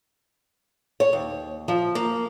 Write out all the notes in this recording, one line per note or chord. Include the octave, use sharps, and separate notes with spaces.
C#5
D#2
F3
A#3